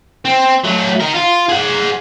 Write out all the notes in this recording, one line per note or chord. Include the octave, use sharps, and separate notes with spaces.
C4
F#3 A3
D#4 A#4
F4
G#4 F#5